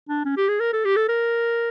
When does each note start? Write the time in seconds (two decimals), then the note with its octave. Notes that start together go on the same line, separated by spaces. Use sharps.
0.09 D4
0.25 C#4
0.37 G4
0.48 G#4
0.60 A#4
0.73 A4
0.85 G4
0.96 A4
1.09 A#4